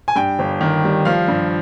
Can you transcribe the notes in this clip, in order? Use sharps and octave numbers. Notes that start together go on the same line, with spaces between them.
G#5
G2 G5
G1
D#3
G3
F3 F5
G2